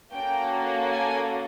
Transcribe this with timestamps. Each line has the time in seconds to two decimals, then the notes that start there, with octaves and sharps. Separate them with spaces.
0.13 A#3 C#4 F#4 A4 G5
0.90 G#5